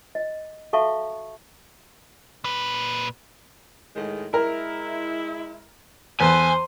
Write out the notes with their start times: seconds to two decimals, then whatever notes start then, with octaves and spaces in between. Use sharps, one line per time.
0.15 D#5
0.73 F#4 A4 E5 F5 A5 C#6
2.44 A#2 B4
3.96 A2 D#3 G#3
4.34 G#3 E4 A#4
6.21 E2 B3 A4 B4 C5 G#5